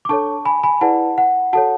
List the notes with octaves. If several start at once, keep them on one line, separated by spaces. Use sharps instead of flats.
D6
D4 A4 C#5 A5 C#6
G#5 B5
G#5 B5
E4 G#4 B4 D5 F#5 A5
F#5
F#4 A4 C#5 F#5 A5